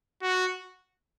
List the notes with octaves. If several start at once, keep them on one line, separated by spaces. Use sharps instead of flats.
F#4